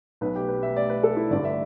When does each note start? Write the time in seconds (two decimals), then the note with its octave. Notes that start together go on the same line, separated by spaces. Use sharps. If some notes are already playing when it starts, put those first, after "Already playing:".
0.21 B1 B2 B4
0.36 G4
0.49 B4
0.63 E5
0.76 D5
0.90 B4
1.03 A4
1.17 E4
1.30 G1 G2 D3 D5
1.45 E5